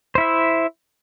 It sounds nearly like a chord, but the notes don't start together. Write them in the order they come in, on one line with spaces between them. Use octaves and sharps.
C5 E4 E5